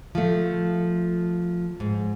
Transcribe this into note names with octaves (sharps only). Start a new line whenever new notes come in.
F3 A3
G#2